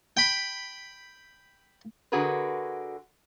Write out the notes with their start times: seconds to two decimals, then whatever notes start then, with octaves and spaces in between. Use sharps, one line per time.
0.17 G5 B5
2.12 D3 F#4 G#4 A#4 B4